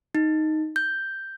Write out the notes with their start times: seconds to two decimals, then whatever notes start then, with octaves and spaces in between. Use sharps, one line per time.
0.15 D#4
0.76 G6